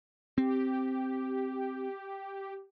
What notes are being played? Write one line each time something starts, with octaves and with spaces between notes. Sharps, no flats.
C4 G4